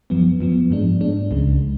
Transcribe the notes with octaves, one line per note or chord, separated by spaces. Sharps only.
F#2 F3 B3
F#2 F3 B3
G#2 G#3 D4
G#2 G#3 D4
C#2 C#3 G#3